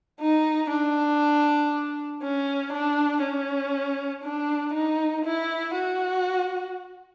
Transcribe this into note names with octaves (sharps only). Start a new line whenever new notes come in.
D#4
D4
C#4
D4
C#4
D4
D#4
E4
F#4